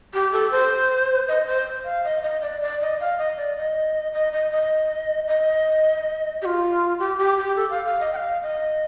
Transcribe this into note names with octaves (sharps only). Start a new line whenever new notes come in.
G4
A4
C5
D#5
C5
F5
D#5
D#5
D5
D5
D#5
F5
D#5
D5
D#5
D#5
D#5
D#5
D#5
G4
F4
G4
G4
G4
A4
F5
F5
D#5
G5
F5
D#5